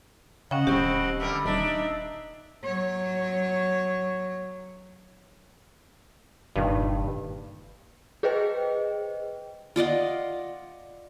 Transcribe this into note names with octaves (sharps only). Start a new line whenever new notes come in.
C#3 C#4 D#5 F#5 G5
D1 G#2 C4 G4 C#6
D3 G3 A#4 E5
D#1 D4 D#4 E5
F#3 C#5
F#1 G2 A#2 D#3
G#4 B4 C5 D#5 G5
F4 D5 D#5 F#5